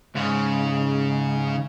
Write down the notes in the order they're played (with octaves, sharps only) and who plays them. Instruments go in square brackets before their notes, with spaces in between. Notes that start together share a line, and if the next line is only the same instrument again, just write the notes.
[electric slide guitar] G#2 [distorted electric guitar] C#3